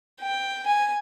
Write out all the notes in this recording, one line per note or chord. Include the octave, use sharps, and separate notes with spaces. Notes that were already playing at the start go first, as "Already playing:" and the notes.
G5
G#5